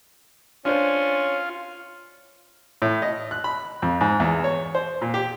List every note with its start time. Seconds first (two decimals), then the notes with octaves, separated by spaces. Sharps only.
0.65 C#4 D4 F4 C5
2.82 A2
3.02 D#5
3.31 F#6
3.44 B5
3.82 F2
4.01 G#2
4.20 E2
4.44 C#5
4.75 C5
5.01 A#2
5.14 G4